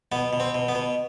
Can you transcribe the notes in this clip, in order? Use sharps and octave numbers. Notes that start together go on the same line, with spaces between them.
B2 B3
B2
C4
B2
B3
B2